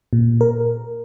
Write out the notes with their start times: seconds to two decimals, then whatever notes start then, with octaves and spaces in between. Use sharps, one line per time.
0.13 A#2
0.41 A#4